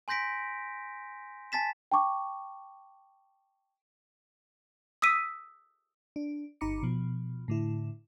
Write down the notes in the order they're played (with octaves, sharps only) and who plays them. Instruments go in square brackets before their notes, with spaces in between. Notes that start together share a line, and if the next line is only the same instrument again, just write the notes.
[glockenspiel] G#5 C6 G6 A#6 B6 D7
G#5 A5 A6 B6 E7
[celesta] G5 A5 C#6 D6
[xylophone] D#6 E6 B6 D#7
[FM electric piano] D4
G1 D#4 A#5 B5 D6 C#7
B2 F3
A2 D3 E4